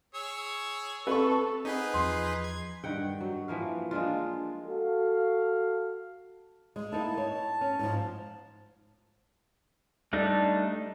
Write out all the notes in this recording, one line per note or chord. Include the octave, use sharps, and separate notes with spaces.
G#4 C#5 E6
C4 A4 B4 C#6
C4 D#4 G#4 B4 D#5 F#5
E2 F3 C6 C7
G#6
G2 D#3 F#5 G5
F#3
E3 F3 A#3 F5
G#3 A#3 D4 F4
F#4 A4 F5
G#3
A#3 D#4 E4 A5
C#5
C#4
G#2 F3
G3 A3 D4 D#4 A4